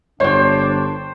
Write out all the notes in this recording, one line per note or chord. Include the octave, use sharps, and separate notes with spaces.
G1 D4 C5 C#5 G5